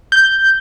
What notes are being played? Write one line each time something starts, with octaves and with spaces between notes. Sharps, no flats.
G6